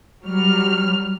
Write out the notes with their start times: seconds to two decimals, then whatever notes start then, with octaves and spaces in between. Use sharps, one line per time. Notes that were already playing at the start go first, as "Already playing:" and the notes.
0.23 F#3 G3 F6